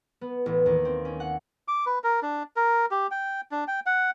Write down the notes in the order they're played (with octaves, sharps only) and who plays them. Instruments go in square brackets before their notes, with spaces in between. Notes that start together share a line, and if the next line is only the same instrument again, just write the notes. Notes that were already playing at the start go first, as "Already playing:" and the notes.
[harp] B3
A1
D#2
C4
C#4
F#5
[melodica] D6
B4
A#4
D4
A#4
G4
G5
D4
G5
F#5